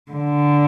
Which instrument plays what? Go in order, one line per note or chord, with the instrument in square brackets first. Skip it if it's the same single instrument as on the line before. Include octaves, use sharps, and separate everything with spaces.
[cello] D3